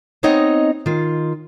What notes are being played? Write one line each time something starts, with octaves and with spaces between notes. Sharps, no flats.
B3 C4 D#4 C#5 D#5
D#3 F4